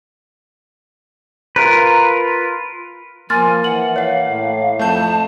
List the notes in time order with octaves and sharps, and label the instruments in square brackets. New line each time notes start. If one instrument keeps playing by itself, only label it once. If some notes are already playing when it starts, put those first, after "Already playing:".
[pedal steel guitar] F4 A#4 B4
[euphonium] F3 [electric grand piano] A#3 [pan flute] G#5 [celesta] C6 F6 A6
[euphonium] E3 [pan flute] F#5 [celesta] F#7
[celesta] C#5 F#5 [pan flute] F5
[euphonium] A2
[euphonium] F2 [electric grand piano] A3 G6 [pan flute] A5